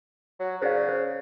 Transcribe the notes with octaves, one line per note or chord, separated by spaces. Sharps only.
F#3
C#3 C5 D5 F5
C5